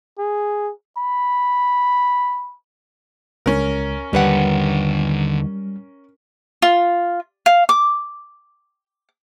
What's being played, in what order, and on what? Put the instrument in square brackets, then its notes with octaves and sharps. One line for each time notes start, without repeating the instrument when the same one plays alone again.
[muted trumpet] G#4
B5
[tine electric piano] C#2 [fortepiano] C#4 A#4
[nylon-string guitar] D#2 B4 F#5 [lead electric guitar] D3 G4 [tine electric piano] G3
[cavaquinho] F4
F5
D6